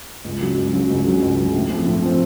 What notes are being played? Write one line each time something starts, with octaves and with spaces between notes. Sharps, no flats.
C#2
C#3 F#3
C#2
C#3 F#3
C#2
C#3 F#3
C#2
C#3 F#3
A2
F3 C4
A2
F3 C4